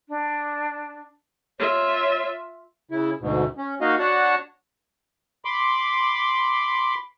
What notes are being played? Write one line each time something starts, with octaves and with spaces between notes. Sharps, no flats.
D4
F4 C#5 E5
C#3 E4
D2 G#2 B2
C#4
A#3 D#4 F#4 D#5 F5
D4 F#4 C#5 F#5 A5
B5 C6 D6